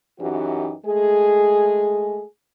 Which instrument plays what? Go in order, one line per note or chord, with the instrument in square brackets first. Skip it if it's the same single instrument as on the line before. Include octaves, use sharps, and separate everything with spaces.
[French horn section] F#2 E3 D#4 F#4 G4
G#3 A3 G#4